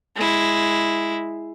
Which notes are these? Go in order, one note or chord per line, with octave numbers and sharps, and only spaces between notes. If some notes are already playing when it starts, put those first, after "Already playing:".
G#3 E4